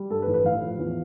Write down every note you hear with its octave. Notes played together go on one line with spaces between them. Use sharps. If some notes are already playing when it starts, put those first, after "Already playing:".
Already playing: G3
G2 A4
B4
A1
B4
A1 F5
F3
E2